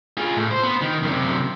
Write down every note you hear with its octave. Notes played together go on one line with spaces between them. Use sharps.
F4 G#4
A2
C5
B3
D#3
F#2 C3